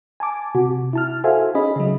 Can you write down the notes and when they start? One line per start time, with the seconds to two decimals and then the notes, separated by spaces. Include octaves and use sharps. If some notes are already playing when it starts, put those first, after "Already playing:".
0.20 G#5 A5 D6
0.55 C3 F#4
0.93 E4 A5 F6
1.24 F#4 A4 C5 E5 F5 G#5
1.55 C#4 D#4 G#4 D#5 B5
1.76 C#3 F#3